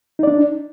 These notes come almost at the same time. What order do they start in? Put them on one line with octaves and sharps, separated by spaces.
D#4 D5 D4